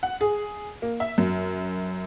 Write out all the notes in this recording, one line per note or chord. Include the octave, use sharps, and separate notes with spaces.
F#5
G#4
A#3
E5
F#2